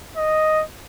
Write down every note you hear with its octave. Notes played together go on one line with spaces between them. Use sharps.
D#5